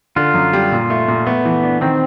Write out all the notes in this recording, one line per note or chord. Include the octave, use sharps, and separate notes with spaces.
D3 F4
F#2
G3
A#2
A3
A#2
A3 B3
E3
D4
D#3 C4